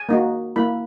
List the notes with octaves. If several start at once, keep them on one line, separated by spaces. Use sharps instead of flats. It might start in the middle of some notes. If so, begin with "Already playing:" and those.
Already playing: G#5
A#3 D#4 F#4
A#3 E4 B5